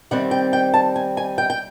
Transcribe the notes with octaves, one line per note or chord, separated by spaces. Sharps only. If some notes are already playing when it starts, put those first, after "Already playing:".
C3 D#3 G3 C4 F#5
G5
G5
A5
G#5
G#5
G5
G5